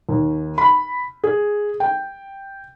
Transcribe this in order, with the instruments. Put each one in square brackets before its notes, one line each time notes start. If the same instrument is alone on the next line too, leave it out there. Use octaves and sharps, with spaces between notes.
[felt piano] D#2
B5
G#4
G5